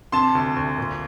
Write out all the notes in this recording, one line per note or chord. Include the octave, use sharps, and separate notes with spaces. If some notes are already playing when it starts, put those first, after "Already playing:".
C3 A5 C6
D2
D2
A#2